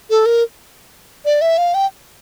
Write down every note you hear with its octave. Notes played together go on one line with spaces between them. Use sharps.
A4
A#4
D5
E5
F5
G5